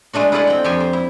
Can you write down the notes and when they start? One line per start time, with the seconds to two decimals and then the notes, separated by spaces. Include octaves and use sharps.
0.13 G#3 A3 D4 F#4
0.32 E4 F4 G#4 A4 D5 F#5
0.47 C4 G5
0.64 F2 G4 A4 G5 G#5 C6
0.80 C5
0.93 E4